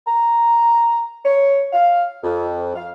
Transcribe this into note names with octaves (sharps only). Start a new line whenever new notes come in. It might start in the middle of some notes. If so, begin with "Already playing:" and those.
A#5
C#5
F5
F2
F5